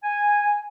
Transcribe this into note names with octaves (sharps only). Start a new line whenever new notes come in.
G#5